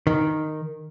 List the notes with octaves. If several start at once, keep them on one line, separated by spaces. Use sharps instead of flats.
D#3